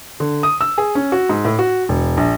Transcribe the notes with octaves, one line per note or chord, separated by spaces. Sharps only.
D3
D#6
E6
G#4
C#4
F#4
G#2
A2
F#4
E1
A#1